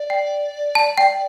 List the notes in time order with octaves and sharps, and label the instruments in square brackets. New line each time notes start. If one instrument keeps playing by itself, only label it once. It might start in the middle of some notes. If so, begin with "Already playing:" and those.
Already playing: [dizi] D5
[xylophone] G5
A5
G5